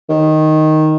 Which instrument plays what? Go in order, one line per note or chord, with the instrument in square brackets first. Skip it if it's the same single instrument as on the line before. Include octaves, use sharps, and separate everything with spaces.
[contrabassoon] D#3